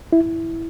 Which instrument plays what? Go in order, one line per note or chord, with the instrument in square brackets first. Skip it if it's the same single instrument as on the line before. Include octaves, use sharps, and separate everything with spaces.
[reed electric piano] E4